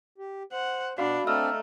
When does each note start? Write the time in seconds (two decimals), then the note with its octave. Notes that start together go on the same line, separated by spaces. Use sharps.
0.18 G4
0.53 C5 F#5
0.98 B2 D4 F#4 F5 F#5 B5
1.27 A3 C4 D4 D5 D#5 A#5 E6 F6